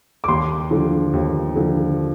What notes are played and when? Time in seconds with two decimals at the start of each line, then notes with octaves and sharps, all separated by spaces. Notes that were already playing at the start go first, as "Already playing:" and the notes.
0.24 D6
0.28 D#2 C6
0.71 D3 F3
1.13 D#2
1.56 D3 F3